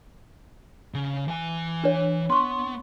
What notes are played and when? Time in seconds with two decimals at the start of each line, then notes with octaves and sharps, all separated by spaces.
0.94 C#3
1.28 E3 G#5
1.84 D4 C#5
2.30 B3 C6 C#6